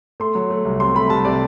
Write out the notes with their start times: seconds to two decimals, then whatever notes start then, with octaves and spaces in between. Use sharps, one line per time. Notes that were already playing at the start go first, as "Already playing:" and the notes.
0.20 A3 C6
0.35 F#3
0.50 A3
0.65 C2
0.80 C3 C6
0.95 A3 B5
1.10 C2 A5
1.25 C3 D5